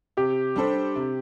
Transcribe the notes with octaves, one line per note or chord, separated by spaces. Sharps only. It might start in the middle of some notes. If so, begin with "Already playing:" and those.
C3 G4
G3 D4 A4 C5
C3